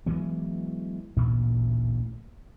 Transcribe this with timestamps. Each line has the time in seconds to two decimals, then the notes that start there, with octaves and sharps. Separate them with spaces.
0.06 E3 F#3 G#3 B3
1.16 A1 D2 A#2